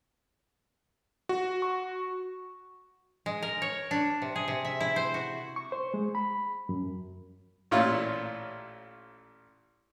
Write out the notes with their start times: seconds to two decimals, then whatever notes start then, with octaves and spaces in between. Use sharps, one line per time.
1.29 F#4
1.62 C#6
3.26 G#3
3.42 A#4
3.62 C#5
3.91 D4
4.22 C3
4.36 G#4
4.48 C3
4.65 E5
4.81 E4
4.96 C5
5.14 F#4
5.56 C#6
5.72 C5
5.94 G#3
6.15 B5
6.69 F#2
7.71 A1 A#2 E4 F4 C#5